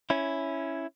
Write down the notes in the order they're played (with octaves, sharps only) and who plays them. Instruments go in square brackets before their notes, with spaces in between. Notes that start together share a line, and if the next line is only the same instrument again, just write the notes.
[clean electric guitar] C#4 E4